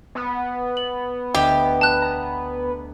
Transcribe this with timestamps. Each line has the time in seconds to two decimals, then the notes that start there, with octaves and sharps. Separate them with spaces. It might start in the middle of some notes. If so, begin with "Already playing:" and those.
0.15 B3
0.77 F#7
1.34 D2 G4 D#5 E5
1.81 A5 F#6
2.02 A#5